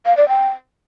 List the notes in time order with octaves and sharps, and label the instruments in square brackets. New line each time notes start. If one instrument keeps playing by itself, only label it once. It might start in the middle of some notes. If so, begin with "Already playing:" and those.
[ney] F5
D5
G5